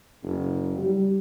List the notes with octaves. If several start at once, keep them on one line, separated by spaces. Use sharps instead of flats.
F#1
G3